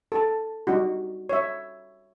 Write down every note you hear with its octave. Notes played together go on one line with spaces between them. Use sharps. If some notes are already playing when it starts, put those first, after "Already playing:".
A4 A5
G3 D#4 F#4
C#5 E5